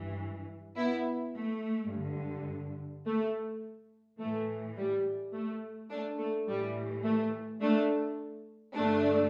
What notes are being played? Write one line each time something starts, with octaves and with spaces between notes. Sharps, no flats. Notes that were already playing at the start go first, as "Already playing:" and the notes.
Already playing: G2 E3
B3 E4
A3
G2 D3
A3
A2 E3 A3
G3
A3
A3 D4
A3
A2 E3 G3
A3
A3 D4
G2 D3 A3 D4